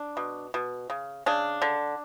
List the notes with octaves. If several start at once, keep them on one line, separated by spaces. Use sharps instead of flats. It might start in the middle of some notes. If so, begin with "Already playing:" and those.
Already playing: D4
B2
B2
C#3
C#3 D4
D3